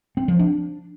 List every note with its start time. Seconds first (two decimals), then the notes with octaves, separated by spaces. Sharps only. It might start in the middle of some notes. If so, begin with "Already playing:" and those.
0.17 C4
0.28 F3
0.39 D4